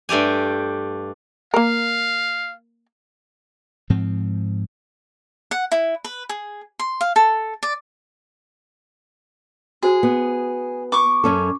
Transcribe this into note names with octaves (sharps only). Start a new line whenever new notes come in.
G2 A3 G4 G#5
A#3 A#4 F5
G#2 F3 C4
F#5
E4
B4
G#4
C6
F5
A4
D5
F#4 G#4 C5
B3
C#6 D6
F#2 C#4 A4